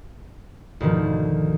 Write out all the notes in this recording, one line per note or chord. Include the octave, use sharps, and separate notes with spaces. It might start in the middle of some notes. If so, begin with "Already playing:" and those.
D2 G#2 B2 D#3 F3